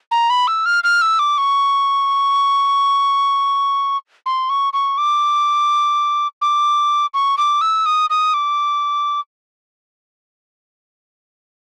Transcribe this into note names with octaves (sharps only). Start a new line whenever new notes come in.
A#5
B5
E6
F6
F6
E6
D6
C#6
C6
C#6
C#6
D6
D6
C#6
D6
E6
D#6
D#6
D6